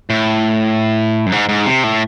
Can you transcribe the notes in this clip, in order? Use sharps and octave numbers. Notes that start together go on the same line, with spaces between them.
A2
F#2
G#2
G#2
C3
A2